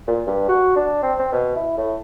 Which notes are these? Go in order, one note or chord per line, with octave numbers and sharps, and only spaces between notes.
A#2
G2
F#4
D4
C4
C4
B2
E4
A2